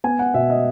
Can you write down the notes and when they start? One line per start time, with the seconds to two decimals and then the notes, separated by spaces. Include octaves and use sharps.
0.04 B3 G#5
0.19 F#5
0.34 B2 E5
0.50 D#5